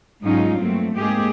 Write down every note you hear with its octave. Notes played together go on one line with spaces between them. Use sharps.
G#2 F#3 G#3 C#4 D#4 F4
G2 F#3 A3 A#3 C4
G#2 G#3 A#3 C4 G4 G#4